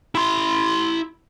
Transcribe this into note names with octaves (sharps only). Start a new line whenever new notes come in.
E4 C6